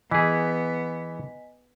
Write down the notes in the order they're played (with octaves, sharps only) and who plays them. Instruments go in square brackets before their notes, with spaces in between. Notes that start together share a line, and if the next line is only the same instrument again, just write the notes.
[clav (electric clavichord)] E3 G#4 [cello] B3 [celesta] D#5 G#5 B6